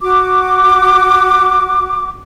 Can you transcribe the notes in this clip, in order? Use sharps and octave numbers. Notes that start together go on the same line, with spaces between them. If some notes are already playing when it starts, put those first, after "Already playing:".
F#4 D6